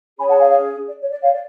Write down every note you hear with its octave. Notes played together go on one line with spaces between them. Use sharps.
C#4 G#4 C#5 G#5 B5
F#5 A5
F5 G#5
C#5 F5
D5
C#5
D5
C#5 F5
D5